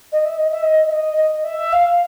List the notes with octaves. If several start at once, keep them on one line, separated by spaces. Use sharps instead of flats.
D#5
E5
D#5
E5
D#5
E5
D#5
D#5
E5
F5